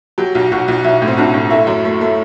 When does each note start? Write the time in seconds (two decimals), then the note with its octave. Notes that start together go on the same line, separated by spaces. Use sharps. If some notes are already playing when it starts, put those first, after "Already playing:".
0.18 F#3 G4
0.35 B1
0.52 B1 F#4
0.68 B1
0.84 B1 E4
1.02 A2
1.08 C4
1.17 B1 D4
1.34 A2
1.50 A3 E4
1.67 F#2
1.85 A3
2.01 A3